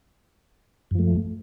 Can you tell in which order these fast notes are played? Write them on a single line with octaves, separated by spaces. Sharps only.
F#2 F3 A3